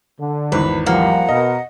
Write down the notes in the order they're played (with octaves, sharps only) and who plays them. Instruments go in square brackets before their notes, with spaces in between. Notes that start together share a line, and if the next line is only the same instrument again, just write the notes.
[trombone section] D3
[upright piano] G#1 E2 [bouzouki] B4
[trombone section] F3 G3 [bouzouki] A#3 [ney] F#5
[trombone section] B2 A#4 [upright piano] D#5